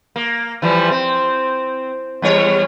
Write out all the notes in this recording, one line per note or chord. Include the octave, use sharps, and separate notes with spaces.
A#3
E3 F3 G3
C4
E2 G3 C#5